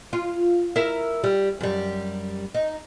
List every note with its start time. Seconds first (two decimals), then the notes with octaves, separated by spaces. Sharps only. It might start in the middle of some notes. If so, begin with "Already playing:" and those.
0.13 F4
0.76 E4 A#4 E5
1.24 G3
1.61 F#2 G3
2.55 D#4